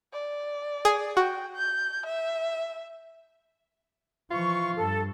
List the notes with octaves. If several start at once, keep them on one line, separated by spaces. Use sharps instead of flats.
D5
G#4
F#4 G5
G6
E5
E3 F3 F4 C#6
G2 A4